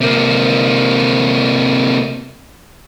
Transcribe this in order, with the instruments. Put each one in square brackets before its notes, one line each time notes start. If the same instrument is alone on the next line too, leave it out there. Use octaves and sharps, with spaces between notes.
[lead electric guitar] C3 A#3